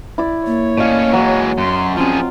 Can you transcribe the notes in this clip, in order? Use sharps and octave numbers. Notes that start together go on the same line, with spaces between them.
E4 D5
A#3 C#5
A2 C#4 D5 D#5 F5
E3 F#3 G#3
F#2 C6
F3 C4 C#4 F4 G#4